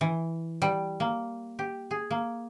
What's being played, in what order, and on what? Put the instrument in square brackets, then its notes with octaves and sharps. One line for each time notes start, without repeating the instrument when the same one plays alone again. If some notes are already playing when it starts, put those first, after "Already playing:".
[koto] E3
G3
A#3
G4
G#4
A#3